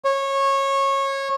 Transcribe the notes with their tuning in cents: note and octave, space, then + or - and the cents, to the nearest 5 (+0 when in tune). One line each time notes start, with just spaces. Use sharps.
C#5 -20